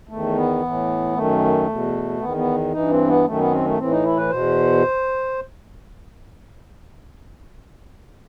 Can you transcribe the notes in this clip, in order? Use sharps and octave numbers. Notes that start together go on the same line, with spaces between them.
E2 D#3 A3
B3
A2 E3
F#2 D#3 A3
E2 B2
E2 D#3 B3
B3
G2 E3 D#4
C4
B3
F#2 D#3 A3
B3
C4
A3
A2 E3 C4
D#4
E4
B4
E2 B2 C5